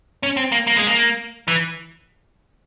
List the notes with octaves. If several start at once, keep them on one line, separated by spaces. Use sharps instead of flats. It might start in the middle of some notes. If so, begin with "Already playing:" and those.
C#4
C4
A#3
A#3
G#3
A#3
E3